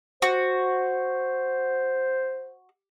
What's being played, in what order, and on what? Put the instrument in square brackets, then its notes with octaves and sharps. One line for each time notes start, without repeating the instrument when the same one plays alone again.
[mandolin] F#4 [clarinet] C5